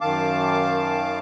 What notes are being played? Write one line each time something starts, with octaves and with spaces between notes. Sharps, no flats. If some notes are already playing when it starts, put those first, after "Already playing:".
F#2 D#3 F5 A5 D6